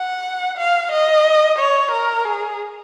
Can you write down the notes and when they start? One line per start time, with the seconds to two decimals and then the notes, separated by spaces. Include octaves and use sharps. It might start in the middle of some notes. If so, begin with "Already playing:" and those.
Already playing: F#5
0.58 F5
0.92 D#5
1.59 C#5
1.91 A#4
2.25 G#4